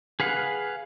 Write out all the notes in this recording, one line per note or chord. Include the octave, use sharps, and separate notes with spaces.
G#4 B4 F5 F#5